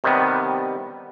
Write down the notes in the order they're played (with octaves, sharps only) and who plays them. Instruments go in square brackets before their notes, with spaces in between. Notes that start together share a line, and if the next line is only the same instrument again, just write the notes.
[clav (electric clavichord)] C3 D#3 G3 B3